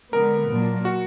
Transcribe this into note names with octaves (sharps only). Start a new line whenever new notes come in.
D3 G#3 B3 A#4
A#2 F#3 D4
F#4